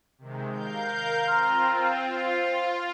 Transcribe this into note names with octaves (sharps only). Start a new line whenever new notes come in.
C3 D#3 G#3
A#4 F5 G6
C4 F4 A#5 C6 F6
F4 C5